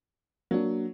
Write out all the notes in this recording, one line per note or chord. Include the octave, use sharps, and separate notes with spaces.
F#3 A#3 D4